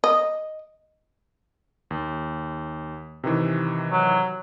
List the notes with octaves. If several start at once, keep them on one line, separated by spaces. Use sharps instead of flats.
D#5
D#2
C3 D#3 E3
F#3